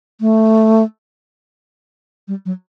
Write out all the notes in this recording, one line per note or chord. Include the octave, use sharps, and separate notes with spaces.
A3
G3
F#3